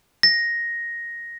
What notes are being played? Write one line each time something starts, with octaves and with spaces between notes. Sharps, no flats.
A#6